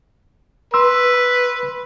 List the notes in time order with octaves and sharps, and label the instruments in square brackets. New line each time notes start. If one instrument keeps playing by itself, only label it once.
[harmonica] B4 [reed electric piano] C6 E6